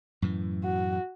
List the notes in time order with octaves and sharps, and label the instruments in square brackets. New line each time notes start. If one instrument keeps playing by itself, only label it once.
[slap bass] F#2 A2 E3
[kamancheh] F#4